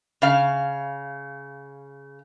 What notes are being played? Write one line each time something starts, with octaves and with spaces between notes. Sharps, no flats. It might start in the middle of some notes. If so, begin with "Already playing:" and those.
C#3 F5